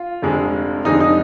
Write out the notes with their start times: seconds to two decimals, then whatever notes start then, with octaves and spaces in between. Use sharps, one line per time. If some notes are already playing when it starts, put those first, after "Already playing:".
Already playing: F4
0.22 F1 F2 D3 G#3
0.85 F1 F2 D3 G#3 D#4
1.00 D#4